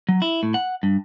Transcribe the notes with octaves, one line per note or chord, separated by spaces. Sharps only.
F#3
E4
A2
F#5
G2